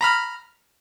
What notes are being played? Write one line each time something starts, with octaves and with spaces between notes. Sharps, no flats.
A#5 B5 F6